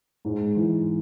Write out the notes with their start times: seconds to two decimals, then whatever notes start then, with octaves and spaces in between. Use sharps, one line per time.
0.25 G#2
0.56 E3